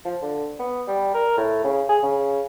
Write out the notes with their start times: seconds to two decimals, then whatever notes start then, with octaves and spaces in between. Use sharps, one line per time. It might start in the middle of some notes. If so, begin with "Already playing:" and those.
0.05 F3
0.22 D3
0.60 B3
0.88 G3
1.14 A#4
1.37 A2
1.64 C#3
1.89 G#4
2.03 C#3